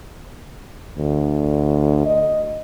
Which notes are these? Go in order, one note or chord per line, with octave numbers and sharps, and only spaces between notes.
D2
D#5